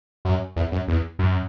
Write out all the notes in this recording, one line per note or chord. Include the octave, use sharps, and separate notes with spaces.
F#2
E2
F#2
E2
F#2